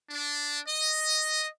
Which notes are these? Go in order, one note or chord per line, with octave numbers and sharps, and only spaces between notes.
D4
D#5